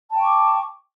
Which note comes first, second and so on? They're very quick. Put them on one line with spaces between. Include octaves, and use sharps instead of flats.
A5 G5 C#6 D6